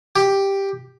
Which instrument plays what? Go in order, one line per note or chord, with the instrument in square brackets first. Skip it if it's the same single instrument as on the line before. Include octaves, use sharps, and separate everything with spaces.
[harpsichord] G4